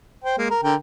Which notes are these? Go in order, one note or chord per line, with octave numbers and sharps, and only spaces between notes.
C5 G5
G#3 A#3
A#4
D3 A#4 G5